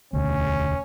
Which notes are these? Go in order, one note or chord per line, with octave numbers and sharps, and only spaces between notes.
E1 D2 C#4